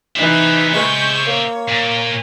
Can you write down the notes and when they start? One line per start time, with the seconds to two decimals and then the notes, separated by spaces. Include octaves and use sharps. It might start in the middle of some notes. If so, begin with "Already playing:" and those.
0.16 E3 D#4 C5 E5
0.75 G#3 C#6 G6
1.27 A#3 C#5
1.68 A#2